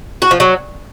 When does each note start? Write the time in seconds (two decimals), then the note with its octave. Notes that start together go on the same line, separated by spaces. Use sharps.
0.22 F#4
0.31 F3
0.40 F#3